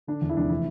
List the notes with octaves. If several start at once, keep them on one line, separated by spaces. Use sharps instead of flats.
D3 D4
E2
E4
F1 D4
E3 E4